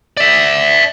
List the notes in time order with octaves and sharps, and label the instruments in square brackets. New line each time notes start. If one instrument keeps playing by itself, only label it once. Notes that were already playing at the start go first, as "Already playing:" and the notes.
[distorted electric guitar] D5 E5